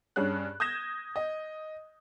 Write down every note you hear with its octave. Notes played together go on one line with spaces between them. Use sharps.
G2 C#4 G#4 F#6
D#6 G6 G#6 A#6 E7
D#5